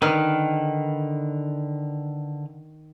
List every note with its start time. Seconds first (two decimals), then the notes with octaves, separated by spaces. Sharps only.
0.02 D3 D#3 B4 F6